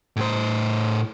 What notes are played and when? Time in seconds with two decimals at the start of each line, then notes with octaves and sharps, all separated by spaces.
0.16 A2 C5